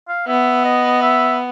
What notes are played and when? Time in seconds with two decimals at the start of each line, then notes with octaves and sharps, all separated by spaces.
0.08 F5
0.28 B3 E5
0.65 D#5
1.02 E5